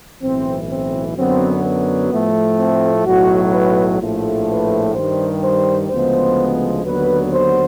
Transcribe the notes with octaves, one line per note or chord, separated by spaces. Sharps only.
B1 A2 E3 C4
C4
F#2 D3 F#3 B3 C4
B3
A2 F3 A3
C4
B1 A2 F#3 F#4
B4
A#1 A2 F3 A3
B4
G2 D#3 G3 C5
C5
D2 C#3 F3 G#3 B3 C5
D#2 D3 F#3 B3 B4
C5